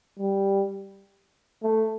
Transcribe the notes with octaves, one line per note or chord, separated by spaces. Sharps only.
G3
A3